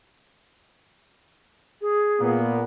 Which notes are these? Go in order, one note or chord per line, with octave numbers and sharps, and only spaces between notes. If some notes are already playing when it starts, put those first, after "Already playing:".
G#4
A#2 A#3 B3